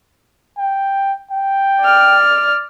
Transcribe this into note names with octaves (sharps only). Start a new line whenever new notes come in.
G5
G5
D5 F6